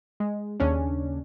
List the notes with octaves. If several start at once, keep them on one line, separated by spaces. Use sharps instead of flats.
G#3
D#2 C#3 C#4 D4